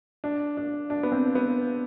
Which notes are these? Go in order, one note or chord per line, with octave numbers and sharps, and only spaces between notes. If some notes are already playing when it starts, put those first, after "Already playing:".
D4
D4
D4
B3
C4
B3